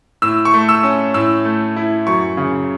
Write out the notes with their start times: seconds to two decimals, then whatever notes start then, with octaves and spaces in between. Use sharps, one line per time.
0.22 A2 E6
0.45 C#6
0.54 A3
0.69 E6
0.83 C#4
1.14 A2 E6
1.45 A3
1.76 E4
2.06 F#2 C#6
2.37 C#3